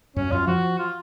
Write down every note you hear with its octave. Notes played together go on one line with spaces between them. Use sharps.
F#2 C#4
F#2 F4
F3 F#4
F4